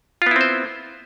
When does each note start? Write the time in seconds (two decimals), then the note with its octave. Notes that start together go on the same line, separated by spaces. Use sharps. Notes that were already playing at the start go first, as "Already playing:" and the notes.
0.22 F4
0.26 B3
0.31 E4
0.36 C4
0.41 C5